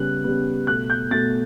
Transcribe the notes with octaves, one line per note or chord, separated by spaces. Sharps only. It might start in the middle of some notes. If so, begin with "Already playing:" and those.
Already playing: C#3 G3 B3 F#6
C#3 G3 B3
B2 A3 F#6
G6
B2 A3 A6